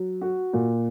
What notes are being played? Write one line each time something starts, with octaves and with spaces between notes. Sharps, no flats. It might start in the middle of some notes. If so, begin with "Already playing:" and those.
Already playing: F#3
F#4
A#2